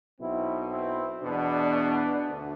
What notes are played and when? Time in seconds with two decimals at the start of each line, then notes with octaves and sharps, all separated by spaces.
0.20 B1 B2 C4 E4
0.71 C4 E4
1.22 E2 B2 B3 D4
2.25 D2